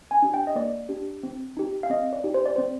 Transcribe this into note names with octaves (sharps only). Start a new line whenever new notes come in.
G#5
D4 G4
G5
D#5
A#3 D5
D4 G4
C4
D#4 G4
F5
C4 D#5
D5
D#4 G4
C5
D5
C4 C5